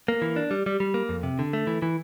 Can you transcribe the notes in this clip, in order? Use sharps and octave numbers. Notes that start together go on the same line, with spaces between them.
A#3
E3
D4
G3
G3
G3
A#3
F2
C3
D3
A3
E3
E3